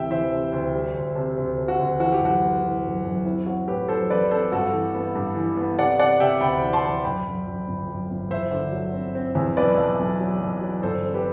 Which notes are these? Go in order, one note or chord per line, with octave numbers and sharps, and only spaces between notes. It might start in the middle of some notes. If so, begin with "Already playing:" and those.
Already playing: D2 C3 E3 E5 G5
E3 C5 E5
C3
D2
G3
D2
C3
D2
C3
F#4
D2
E3 F#4
G4
F#2 F#4
B3
E3
F#2
F#2
C4 E4
F#3 F#4
A2 G4 B4
F#3 A4 C5
A1 B4 D5
C4 A4 C5
G2 F#4 A4
E3
B3
G2
E3
B3
C3 D5 F#5
C3 D5 F#5
C3 E5 G5
D2 G5 B5
E3
A5 C6
E3
F#2 G5 B5
F#2
F#2
G1
F#2
G1
E2 C5 E5
D3
F#3
C4
C4
E2
B1 B4 D5
B1
B1
F#3
B1
F#3
G1 A4 C5
C4
G4 B4